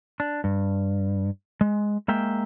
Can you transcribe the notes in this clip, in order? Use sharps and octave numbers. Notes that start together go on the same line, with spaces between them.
D4
G2
G#3
G#3 A#3 E5 G5